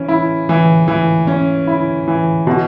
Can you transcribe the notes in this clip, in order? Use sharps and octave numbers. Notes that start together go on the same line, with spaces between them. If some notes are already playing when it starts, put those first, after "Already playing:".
Already playing: E3 C#4
E4
E3
E3
C#4
E4
E3
B2